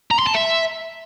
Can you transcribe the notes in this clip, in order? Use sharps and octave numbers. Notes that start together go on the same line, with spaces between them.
A#5
C6
A5
E5